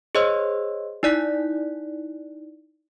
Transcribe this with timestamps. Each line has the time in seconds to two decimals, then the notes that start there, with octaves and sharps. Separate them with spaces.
0.15 G#4 C5 C#5 D#5 C6 E6
1.03 D#4 E4 D5 F#6 B6